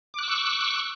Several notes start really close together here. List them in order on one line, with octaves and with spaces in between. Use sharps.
D6 F#6 E6 C#6